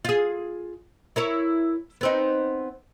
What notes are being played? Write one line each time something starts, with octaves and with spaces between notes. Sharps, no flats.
F4 G#4
E4 A#4 C#5
B3 C4 D#4